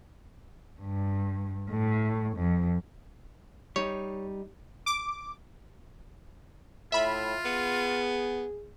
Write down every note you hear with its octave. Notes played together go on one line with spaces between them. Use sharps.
G2
A2
F2
G3 D#4 C#5
D6
A2 F4 E5 B5
B3 G#4